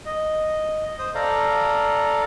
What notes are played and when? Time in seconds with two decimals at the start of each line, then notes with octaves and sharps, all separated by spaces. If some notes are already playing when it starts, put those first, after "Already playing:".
0.06 D#5
0.99 C5 D#6
1.15 A4 D5 F5 A#5